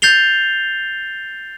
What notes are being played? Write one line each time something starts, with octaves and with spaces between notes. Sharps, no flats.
G6 A6 C7 F7 G7